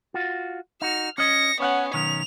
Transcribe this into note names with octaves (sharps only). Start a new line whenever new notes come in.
F4 F#4
D#4 F#4 F6
C#4 D#5 A#6 C#7
B3 C#4 C#5 F5 F#5
B1 D#3 C#4 F7